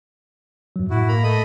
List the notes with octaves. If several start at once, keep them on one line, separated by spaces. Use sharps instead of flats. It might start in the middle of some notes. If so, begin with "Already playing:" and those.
F#2 F#3
A2 E4 F#4
A#3 A#5 B5
A3 D#5 B5